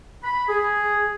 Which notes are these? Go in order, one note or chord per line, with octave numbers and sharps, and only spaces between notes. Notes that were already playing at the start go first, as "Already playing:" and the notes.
B5
G#4